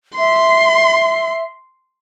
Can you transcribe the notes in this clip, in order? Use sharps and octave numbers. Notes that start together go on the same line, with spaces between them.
E5 C6